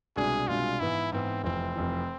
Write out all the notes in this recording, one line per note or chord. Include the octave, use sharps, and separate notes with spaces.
C2 B2 G#3 D4 G#4
C2 B2 G#3 D4 F4
G#2 E3 B3 E4
G#2 E3 B3 C4
F1 F2 E3 C4
F1 F2 E3